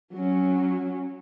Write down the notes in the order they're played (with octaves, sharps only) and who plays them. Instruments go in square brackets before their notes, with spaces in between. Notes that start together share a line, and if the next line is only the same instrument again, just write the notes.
[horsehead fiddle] F#3 C#4